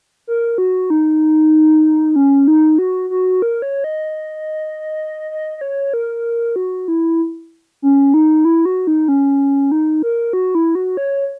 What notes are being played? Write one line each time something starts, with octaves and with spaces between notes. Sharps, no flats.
A#4
F#4
D#4
C#4
D#4
F#4
F#4
A#4
C#5
D#5
D#5
D#5
C#5
A#4
F#4
E4
C#4
D#4
E4
F#4
D#4
C#4
D#4
A#4
F#4
E4
F#4
C#5